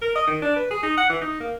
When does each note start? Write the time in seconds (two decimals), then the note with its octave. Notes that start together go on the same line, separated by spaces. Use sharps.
0.02 A#4
0.15 D#5
0.27 D#3
0.42 D4
0.56 B4
0.71 G#4
0.83 D#4
0.97 F#5
1.10 E3
1.21 D#4
1.40 A#3